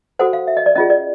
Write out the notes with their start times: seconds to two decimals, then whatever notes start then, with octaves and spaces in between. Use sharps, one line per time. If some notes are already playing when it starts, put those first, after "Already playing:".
0.19 F#4 A4 C5 F#5
0.33 F5
0.47 E5
0.57 D#5
0.66 D5
0.76 C#4 F4 G#4 D#5
0.90 D5